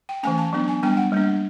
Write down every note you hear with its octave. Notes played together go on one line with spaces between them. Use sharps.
G5
E3 A3 C#4 G#5
A5
F#3 B3 D4
G#5
G3 B3 D4 G5
F#5
G3 A#3 D4